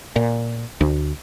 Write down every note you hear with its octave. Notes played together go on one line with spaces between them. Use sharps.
A#2
D2